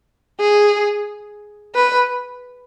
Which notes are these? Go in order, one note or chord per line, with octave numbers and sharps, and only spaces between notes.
G#4
B4